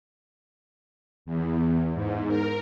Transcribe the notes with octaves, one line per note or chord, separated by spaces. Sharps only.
E2
G#2
A#4